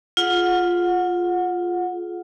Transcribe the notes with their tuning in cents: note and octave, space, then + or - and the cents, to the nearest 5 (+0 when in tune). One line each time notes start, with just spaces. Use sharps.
F4 +0 G#4 +30 F#5 -20